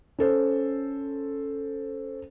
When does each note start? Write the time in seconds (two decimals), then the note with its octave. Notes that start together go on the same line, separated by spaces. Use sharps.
0.18 C#4 A4 C5